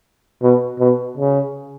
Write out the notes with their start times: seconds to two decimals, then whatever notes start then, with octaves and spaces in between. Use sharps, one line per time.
0.42 B2
0.79 B2
1.17 C#3